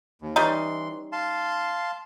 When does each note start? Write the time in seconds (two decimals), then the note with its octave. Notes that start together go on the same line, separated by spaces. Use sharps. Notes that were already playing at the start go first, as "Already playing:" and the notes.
0.22 D#2
0.36 E3 G3 C#4 D#4 C6
1.12 F5 A5 C6